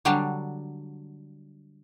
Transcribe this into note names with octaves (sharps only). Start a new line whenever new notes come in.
D3 F#3 G3 D4 A5